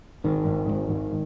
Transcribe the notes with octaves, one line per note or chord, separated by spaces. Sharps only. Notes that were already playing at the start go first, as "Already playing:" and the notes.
G#1 D#3
G#1
G#1
G#1